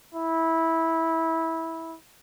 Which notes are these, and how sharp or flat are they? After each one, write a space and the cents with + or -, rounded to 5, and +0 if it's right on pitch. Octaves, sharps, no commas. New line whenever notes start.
E4 -15